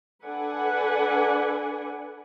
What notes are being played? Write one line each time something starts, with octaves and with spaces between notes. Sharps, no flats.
D4 A4 B4 D5 F#5 G#5